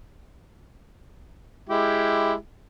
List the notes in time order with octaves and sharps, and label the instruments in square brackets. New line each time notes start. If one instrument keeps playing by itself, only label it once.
[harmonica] G#3 E4 G4